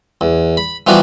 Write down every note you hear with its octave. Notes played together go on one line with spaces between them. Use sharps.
E2
B5
E3 F3 G3 B3 F#4 D5